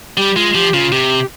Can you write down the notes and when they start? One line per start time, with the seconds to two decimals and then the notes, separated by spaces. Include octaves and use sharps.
0.17 G3 G4
0.36 G#3 F4
0.55 F3 G4
0.74 C#3 F4
0.92 C3 G4